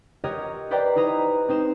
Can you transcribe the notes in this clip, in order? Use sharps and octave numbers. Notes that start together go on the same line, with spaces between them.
F#4 G4 A#4 C#5 D#5
B4 C5 D5 E5 G5 A#5
D#4 E4 B4 D#5 A#5
C4 D#4 C5 E7